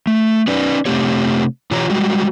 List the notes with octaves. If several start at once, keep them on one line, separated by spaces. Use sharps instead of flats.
A3
C#4 D#4 B4 D5
C3 E3 A3 C4 G4 C#5
B2 E3 F4 G4 C#5 A#5
G3 G#3 F#4